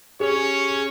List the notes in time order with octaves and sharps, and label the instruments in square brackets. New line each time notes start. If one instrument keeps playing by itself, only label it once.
[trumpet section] C#4 C#5 [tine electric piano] G4 G#4